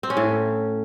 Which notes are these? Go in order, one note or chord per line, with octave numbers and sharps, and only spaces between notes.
C4
C#4
A2